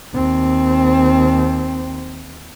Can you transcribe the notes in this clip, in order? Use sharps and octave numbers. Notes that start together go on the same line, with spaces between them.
D#2 C4